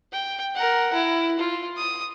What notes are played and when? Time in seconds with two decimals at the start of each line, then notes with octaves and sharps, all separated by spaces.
0.12 G5
0.55 A#4 F#5
0.93 E4
1.39 F4
1.77 D#6